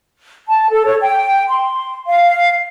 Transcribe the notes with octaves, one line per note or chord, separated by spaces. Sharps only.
A5
A4
C#5
G5
C6
F5